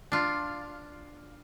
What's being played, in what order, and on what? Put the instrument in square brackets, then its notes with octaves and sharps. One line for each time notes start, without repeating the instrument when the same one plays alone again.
[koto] D4 F4